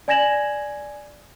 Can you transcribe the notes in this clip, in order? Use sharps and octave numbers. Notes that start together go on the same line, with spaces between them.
D5 G#5 G#6 A#6 E7 F#7